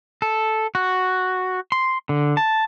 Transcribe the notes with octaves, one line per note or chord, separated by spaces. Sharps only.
A4
F#4
C6
D3
A5